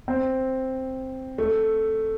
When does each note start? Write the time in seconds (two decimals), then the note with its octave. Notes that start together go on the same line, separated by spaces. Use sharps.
0.08 C4
1.38 A3